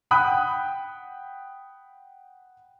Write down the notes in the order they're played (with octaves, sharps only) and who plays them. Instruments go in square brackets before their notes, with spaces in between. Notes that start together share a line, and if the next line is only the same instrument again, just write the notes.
[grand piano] F#5 G5 B5 D#6 F#6